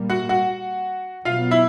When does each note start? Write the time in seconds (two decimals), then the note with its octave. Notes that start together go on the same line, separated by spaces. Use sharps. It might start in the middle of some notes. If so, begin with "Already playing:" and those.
Already playing: A#2 G3 A#3
0.10 F#4 F#5
0.29 F#4 F#5
1.25 B2 F#3 B3 F4 F5
1.51 E4 E5